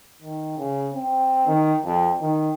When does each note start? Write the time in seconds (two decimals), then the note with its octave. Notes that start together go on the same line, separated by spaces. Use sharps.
0.22 D#3
0.58 C#3
0.94 C4
1.48 D#3
1.85 F2
2.21 D#3